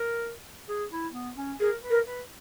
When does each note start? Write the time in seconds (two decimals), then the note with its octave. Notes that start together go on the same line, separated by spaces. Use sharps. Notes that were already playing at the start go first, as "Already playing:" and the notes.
Already playing: A#4
0.69 G#4
0.91 E4
1.14 B3
1.37 C#4
1.60 G#4 A#4
1.83 B4
1.90 A#4
2.05 B4